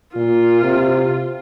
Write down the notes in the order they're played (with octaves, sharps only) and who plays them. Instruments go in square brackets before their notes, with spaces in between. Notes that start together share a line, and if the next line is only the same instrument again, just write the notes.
[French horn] A#2 [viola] F4
[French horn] C3